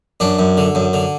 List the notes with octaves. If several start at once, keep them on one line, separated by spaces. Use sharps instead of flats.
F#2 D4
F#2
D3
F#2
D3